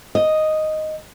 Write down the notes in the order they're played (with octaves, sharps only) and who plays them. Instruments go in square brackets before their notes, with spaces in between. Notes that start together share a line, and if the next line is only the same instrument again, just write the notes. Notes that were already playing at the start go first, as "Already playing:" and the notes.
[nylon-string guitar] D#5